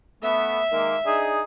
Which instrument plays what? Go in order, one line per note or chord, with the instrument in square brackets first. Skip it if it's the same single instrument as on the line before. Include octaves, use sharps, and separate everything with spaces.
[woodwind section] A3 B3 [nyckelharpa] E5
[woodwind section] D#3 G#3 A#3
D4 D#4 G#4